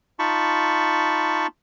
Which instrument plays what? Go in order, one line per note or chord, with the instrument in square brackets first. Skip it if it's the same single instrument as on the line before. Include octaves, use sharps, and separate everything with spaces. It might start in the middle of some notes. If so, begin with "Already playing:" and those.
[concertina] D#4 F4 A5 B5 C#6